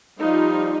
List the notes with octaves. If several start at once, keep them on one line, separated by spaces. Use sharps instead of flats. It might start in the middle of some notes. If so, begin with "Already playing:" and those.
F3 G3 D#4 F4